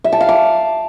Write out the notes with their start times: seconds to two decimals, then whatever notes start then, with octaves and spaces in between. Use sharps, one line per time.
0.04 E5
0.12 A5
0.21 F5
0.29 D6